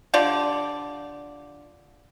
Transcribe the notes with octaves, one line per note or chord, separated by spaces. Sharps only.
D3 F4 G4 D5